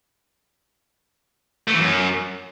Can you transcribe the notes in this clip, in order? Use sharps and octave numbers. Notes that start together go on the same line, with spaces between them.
A3
E3
F#2